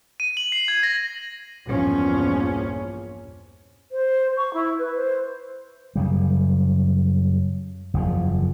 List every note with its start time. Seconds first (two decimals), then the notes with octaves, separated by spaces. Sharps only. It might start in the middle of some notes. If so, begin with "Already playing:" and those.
0.20 D#7
0.37 F#7
0.52 C7
0.68 G#6
0.83 A#6
1.66 A#1 E2 G2 F3 C#4
3.91 C5
4.37 C#6
4.54 E4
4.78 B4
4.96 C5
5.96 F#2 C#3 G3
7.94 F#1 E2 B2 F3